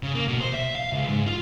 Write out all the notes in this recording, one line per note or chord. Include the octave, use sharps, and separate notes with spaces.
C#3
A#3
B2
C5
E5
F5
C#2
G#2
F4